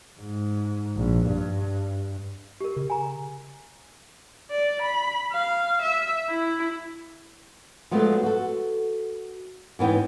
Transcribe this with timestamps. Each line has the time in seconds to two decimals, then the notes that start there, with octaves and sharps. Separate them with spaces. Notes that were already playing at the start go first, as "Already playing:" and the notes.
0.20 G#2
0.96 A#1
1.28 G2
2.61 G4 A#4
2.77 C#3
2.90 G#5 A#5
4.51 D5
4.82 B5
5.33 F5
5.82 E5
6.30 E4
7.91 F3 F#3 G#3 A3 B3
8.23 F#4 A4
9.79 G#2 E3 B3 C#4 G5